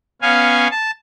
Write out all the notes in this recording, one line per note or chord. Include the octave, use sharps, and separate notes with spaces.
B3 C#4 F5 G#5
A5